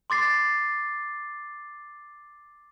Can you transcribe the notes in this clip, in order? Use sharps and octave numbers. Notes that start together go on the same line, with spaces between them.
C6 D6 A6 C7